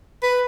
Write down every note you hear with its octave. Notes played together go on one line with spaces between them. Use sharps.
B4